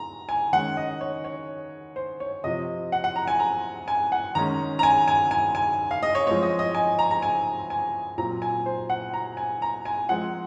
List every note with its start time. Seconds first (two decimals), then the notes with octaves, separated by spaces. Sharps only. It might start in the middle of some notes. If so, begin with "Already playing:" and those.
Already playing: A#5
0.29 G#5
0.52 D#3 G#3 C#4 F#5
0.77 D#5
1.01 C#5
1.25 C#5
1.96 C5
2.20 C#5
2.44 C3 F3 C4 D#5
2.92 F#5
3.04 F#5
3.16 A#5
3.28 G#5
3.40 A#5
3.88 G#5
4.12 F#5
4.35 D#3 G#3 C#4 A#5
4.79 A#5
4.83 G#5
5.08 G#5
5.31 G#5
5.55 G#5
5.91 F5
6.03 D#5
6.15 C#5
6.27 F3 G#3 C4 C#5
6.43 D#5
6.59 D#5
6.75 G#5
6.99 A#5
7.11 A#5
7.22 G#5
7.70 G#5
8.18 A#2 F#3 C4 A#5
8.42 G#5
8.66 C5
8.90 F#5
9.14 A#5
9.37 G#5
9.62 A#5
9.85 G#5
10.09 F3 G#3 C4 F#5